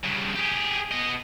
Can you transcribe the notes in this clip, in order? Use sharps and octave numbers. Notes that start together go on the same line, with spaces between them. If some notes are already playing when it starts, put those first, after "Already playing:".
G2 C#3
G4 G#4
B3 D#5